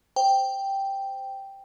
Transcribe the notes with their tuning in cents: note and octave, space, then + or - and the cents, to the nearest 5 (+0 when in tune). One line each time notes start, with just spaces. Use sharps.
C5 +0 G5 +0